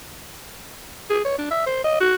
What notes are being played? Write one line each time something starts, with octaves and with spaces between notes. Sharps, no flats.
G#4
C#5
D4
E5
C5
D#5
F#4